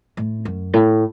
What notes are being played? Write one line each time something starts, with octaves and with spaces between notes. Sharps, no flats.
A2
F#2
A2